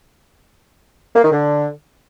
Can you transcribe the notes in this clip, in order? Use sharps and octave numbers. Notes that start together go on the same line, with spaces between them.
A#3
D#3
D3